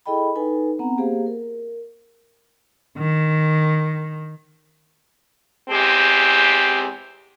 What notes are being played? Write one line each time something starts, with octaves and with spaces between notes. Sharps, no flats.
E4 G#4 A4 D#5 G5 B5
D#4 A4 B4 G#5
B3 C4 F#5 A#5
A#3 G4 G#4 C5 F5
A#4
D#3
E2 G#3 C4 G4